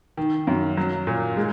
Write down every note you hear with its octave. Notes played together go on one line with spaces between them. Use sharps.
D#3
F#2
F#3
A#2
G#3